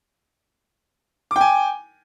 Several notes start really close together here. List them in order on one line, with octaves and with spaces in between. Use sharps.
D6 G5 G#5